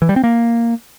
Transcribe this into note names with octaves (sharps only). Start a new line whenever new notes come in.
E3
G3
C4
A#3